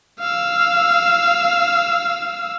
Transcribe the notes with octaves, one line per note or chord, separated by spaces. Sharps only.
F5 E6